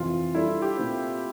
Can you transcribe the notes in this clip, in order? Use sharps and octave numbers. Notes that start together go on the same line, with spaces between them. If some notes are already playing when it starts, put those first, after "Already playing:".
Already playing: F2 C3 E3 F4
G3 D4 E4 A4 D5
E4
G4
A#2 A3 C4